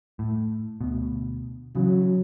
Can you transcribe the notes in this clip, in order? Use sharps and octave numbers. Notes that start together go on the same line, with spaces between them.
A2
D2 B2
C#3 E3 F#3